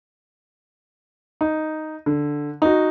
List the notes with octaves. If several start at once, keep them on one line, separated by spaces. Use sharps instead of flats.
D#4
D3
D#4 F#4